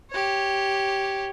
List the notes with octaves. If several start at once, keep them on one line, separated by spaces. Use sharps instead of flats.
G4 C#5